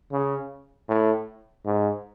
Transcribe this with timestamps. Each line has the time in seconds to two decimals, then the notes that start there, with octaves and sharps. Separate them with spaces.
0.12 C#3
0.89 A2
1.66 G#2